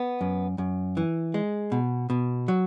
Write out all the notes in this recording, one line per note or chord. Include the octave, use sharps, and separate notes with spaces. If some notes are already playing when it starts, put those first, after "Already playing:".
Already playing: B3
F#2
F#2
E3
G#3
B2
B2
F#3